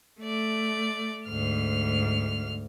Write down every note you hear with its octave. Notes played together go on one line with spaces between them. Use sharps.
A3 D5
D2 G#2 F6